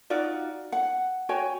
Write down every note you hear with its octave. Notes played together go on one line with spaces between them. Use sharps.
D#4 F4 F#4 D5
F#5
F#4 C#5 G5 G#5